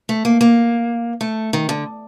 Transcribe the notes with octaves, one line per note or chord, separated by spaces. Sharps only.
A3
A#3
A#3
A3
D#3
D3